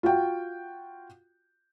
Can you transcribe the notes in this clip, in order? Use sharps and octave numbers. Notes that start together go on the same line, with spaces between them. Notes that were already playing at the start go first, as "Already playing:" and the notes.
F4 F#4 F#5 G5